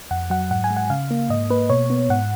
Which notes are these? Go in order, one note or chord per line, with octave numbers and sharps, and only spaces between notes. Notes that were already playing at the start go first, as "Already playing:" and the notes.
F2 F#5
F#3 F#5
G#2 F#5
G#5
G#3
F#5
C#3 F5
A#3
G#2 D#5
A#3 B4
B2 C#5
B3
G#2 F#5